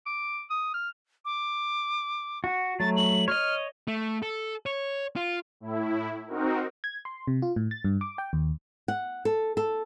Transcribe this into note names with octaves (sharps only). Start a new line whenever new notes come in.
D6
D#6
F6
D6
F#4
F#3 A3 A6
F#7
C#5 D#5 F6
A3
A4
C#5
F4
A2 E4
C4 D#4 F#4 A#4
G#6
C6
C3
F4
A2
A6
G2
D6
G5
D#2
F#5
A4
A4